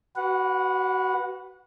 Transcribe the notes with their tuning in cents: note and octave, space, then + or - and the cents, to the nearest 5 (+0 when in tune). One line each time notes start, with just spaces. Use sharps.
F#4 +25 B4 +0 F#5 -25